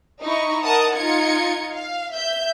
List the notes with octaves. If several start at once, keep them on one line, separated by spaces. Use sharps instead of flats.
D#4 E4 C#6
A#4 D#5 F#5 A5 D#6
D#4 F4 G#6 C#7
F5
E5 G6